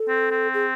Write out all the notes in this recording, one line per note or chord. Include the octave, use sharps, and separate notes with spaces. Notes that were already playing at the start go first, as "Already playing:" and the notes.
Already playing: A4
C4
C4
G#4